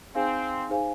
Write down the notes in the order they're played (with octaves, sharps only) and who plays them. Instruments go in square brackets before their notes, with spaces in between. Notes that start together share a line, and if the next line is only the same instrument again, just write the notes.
[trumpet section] C4 [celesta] D#4 G#4 C5 F5 G#5
[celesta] D#4 G#4 C5 F5 G#5